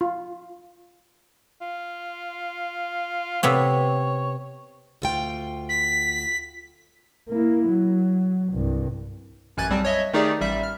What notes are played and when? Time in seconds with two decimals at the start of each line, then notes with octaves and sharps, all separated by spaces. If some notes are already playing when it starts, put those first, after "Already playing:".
0.01 F4
1.62 F4
3.43 C3 B3 C4 C#5
5.02 D2 F4 G5
5.69 B6
7.29 A#3 E4
7.68 F#3
8.52 C2 G2
9.57 A1 F#2 G#5 F#6 G#6 A6
9.70 B1 G3 C4 A5
9.85 C#5 D#5 E5
10.13 D#3 A3 D#4 G4 G#4 D5
10.41 A1 G3 E5
10.63 F6